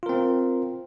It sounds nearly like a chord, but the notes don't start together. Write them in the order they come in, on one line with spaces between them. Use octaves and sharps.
F4 A#4 C4